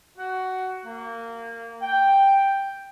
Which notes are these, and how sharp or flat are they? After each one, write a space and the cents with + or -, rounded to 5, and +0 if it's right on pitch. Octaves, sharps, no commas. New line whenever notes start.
F#4 +15
A#3 -20
G5 +0